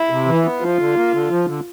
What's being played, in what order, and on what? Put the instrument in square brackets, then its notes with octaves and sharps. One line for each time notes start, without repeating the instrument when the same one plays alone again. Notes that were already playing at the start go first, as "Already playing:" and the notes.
Already playing: [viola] E4
[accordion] C3
E3
B3
[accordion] F3 [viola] F4
[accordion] D3
A#3
D3
F3
D3